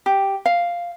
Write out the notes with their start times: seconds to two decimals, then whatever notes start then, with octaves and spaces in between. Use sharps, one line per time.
0.06 G4
0.46 F5